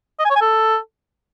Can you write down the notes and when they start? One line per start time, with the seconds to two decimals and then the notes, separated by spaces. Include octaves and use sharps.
0.20 D#5
0.25 G#5
0.30 C#5
0.36 G#5
0.41 A4